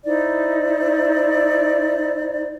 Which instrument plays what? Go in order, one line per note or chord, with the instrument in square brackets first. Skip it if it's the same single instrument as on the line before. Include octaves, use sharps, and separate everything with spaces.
[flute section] D#4 E4 C5 D5